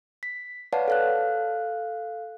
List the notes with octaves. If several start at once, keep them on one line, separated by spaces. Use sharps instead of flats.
B6
B4 C#5 D5 F5 F#5 A5
A4 F5 F#6